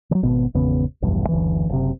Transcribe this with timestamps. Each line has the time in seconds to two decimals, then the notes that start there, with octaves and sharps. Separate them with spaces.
0.11 D#3 F#3
0.23 G#1 B2 B3
0.54 G#1 E2 C#3 B3
1.02 F1 B1 E2 G2
1.29 F#1 D2 E3
1.69 F#1 C3